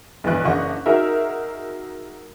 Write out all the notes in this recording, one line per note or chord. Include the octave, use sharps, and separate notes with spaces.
B1 G2 E3 D#5 C#6 F#6
F#1 E3 D4 D#5 F#5 C#6
D#4 F#4 G#4 A#4 E5